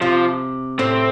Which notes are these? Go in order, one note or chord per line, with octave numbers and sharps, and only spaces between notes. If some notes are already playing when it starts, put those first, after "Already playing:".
C3 F3
A2 C4